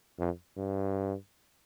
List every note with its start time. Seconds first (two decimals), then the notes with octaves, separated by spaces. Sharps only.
0.19 F2
0.57 G2